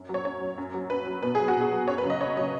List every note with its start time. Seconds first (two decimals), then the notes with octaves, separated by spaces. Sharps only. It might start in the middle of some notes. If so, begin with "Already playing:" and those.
Already playing: F#2
0.09 F#3
0.14 C#5
0.25 F#2 C#5
0.41 F#3
0.58 F#2
0.74 F#3
0.90 F#2 B4
1.07 F#3
1.23 B2 B4
1.35 F#3 G#4
1.48 F#4
1.56 B2
1.61 G#4
1.72 F#3
1.88 F#2 C#5
1.98 B4
2.04 C#3 F#3
2.10 D#5
2.20 F#2 C#5
2.36 C#3 F#3 D#5